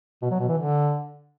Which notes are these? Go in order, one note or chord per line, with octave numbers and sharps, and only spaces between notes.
B2
F#3
B2
E3
D3